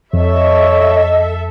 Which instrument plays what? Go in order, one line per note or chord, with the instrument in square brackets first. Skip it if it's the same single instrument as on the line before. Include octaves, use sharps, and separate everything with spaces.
[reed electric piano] F2 [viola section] A4 E5 [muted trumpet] C#5 [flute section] D#5